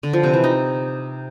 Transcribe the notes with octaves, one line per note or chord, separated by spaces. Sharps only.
D3
F3
C3
E3
D#4